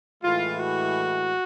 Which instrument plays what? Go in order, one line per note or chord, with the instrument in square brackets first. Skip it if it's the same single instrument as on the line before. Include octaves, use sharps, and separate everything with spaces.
[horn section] A2 E3 G#3 F4
F#4